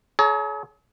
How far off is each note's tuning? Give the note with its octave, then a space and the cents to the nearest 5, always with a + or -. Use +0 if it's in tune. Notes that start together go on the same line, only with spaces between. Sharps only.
G#4 +45 C#5 +25 A#5 +0